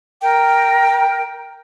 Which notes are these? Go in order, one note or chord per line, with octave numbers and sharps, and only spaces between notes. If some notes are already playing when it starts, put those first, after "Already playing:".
A#4 G5